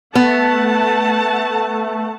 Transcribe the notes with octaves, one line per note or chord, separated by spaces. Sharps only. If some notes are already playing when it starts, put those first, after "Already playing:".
A3 B3 F#5 A5